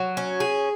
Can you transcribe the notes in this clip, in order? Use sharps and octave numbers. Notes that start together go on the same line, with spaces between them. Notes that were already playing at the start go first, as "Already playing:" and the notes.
Already playing: F#3
C#4
G#4